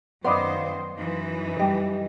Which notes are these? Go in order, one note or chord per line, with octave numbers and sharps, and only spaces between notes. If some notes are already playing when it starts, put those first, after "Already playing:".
F#2 D#3 B3 C5 D5 D#5 F5 C6
F#2 E3 D#4
G3 G4 D#5